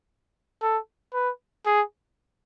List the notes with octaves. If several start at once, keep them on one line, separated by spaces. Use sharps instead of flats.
A4
B4
G#4